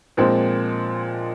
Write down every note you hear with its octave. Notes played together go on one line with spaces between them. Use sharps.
A#2 F3 G#3 C4